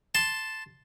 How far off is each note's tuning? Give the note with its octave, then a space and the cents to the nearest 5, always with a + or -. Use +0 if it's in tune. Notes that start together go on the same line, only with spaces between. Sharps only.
A5 +0 C6 +0